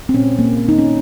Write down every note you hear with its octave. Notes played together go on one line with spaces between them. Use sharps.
C4
A#2 G#3 C#4
A#3
D#4
C#4